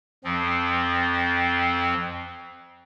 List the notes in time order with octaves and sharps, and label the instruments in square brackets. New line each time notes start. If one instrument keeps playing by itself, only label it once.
[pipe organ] F2 F3 C4